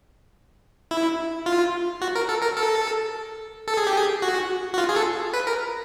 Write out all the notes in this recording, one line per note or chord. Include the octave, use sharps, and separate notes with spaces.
E4
F4
F#4
A#4
A4
A#4
A4
A4
G#4
G4
G#4
F#4
F#4
F4
G#4
A4
B4
A#4